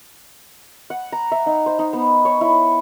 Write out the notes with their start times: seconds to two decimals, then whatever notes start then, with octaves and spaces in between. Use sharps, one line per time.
0.90 F#5
1.12 A#5
1.32 E5
1.46 D#4
1.66 C5
1.79 D#4
1.93 B3
2.25 C#5
2.41 E4